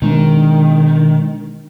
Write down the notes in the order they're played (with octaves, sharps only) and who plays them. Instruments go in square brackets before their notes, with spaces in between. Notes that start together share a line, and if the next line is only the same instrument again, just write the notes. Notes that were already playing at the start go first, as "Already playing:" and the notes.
[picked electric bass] B2 G#3 D4 [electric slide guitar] D#3